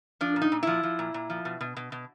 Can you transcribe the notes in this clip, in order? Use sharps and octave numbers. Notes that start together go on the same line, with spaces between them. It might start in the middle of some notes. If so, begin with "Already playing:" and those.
F3 D4
A#2
D#4
A#2
F3 E4
F3
A#2
A#2
F3
B2
B2
B2
B2